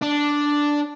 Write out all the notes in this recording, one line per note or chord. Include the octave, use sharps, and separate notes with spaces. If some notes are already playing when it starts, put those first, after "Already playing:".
D4